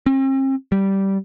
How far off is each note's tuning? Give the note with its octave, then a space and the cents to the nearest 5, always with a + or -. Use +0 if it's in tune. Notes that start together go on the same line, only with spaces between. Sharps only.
C4 +45
G3 -10